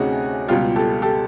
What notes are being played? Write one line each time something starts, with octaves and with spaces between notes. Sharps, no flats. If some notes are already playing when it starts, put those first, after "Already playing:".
Already playing: D2 C3 A3 C#4 D#4 F#4 G#4
C#2 B2 G3 F4 G4
G4 A4
G4 A4